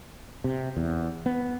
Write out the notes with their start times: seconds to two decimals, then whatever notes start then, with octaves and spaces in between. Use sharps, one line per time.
0.44 C3
0.77 E2
1.26 B3